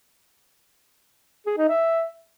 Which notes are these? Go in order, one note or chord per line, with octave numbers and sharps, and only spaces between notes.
G#4
D#4
E5